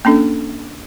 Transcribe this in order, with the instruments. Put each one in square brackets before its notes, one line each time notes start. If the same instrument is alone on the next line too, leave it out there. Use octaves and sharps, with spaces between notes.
[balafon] A#3 C#4 D4 A4